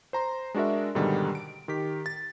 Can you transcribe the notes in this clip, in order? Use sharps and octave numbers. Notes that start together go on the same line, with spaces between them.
C5 A#5 C6
G#3 D4 F#4 A#4 E5
G#2 B2 D3 D#3 G3
D7
D#3 G4 B6
A6